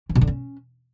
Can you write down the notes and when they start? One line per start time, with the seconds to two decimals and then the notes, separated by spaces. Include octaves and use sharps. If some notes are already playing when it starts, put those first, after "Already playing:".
0.09 E3
0.15 B2
0.21 D3
0.27 C#4